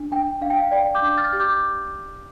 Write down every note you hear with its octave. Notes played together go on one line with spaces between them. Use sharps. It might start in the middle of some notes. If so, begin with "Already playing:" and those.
Already playing: D4
D4 G5
D4 F5
G5
F5
D5 G5
D6 G6
D4
F6 A6
G4
D6 G6